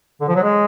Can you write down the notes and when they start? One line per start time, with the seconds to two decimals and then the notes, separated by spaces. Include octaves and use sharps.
0.21 D3
0.28 F3
0.35 F#3
0.43 G#3